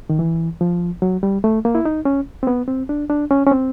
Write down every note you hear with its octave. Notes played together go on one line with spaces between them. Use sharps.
D#3
E3
F3
F#3
G3
A3
A#3
E4
D#4
C#4
C4
B3
C4
D4
D4
C#4
C#4
C4